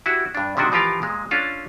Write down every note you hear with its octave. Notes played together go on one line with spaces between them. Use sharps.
E4 F#4 G4
G2 D4
C3 D#3 G#3 D4 F#4
E3 F3 F4 G4 A#4 F5
A#2 G#3
C#4 D4 F4 A4